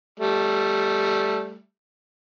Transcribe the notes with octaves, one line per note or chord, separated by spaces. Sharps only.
G3 A3